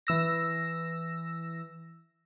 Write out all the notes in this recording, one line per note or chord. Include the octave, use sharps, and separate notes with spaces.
E3 E6 A#6